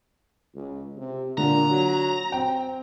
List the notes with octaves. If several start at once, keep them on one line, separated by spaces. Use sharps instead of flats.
C#2
C3
A#2 D3 A#5
F#3
C4 G5